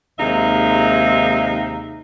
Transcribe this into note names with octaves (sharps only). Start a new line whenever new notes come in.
D#2 C3 G#3 D#4 E5 F5